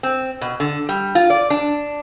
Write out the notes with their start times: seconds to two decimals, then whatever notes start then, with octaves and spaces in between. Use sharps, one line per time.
0.03 C4
0.41 B2
0.60 D3
0.89 G3
1.15 F4
1.30 D5
1.50 D4